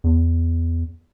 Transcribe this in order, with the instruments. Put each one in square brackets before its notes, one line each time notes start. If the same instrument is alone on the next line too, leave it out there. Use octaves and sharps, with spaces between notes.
[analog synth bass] E2